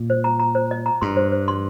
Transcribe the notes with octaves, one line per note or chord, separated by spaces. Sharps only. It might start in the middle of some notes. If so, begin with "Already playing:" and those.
Already playing: A#2
C5
A#5
A#5
C5
D#5
A#5
G2 C6
C5
C5
C6